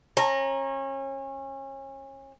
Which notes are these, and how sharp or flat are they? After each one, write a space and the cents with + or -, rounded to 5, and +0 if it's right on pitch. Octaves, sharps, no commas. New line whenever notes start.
C#4 -30 A#5 +0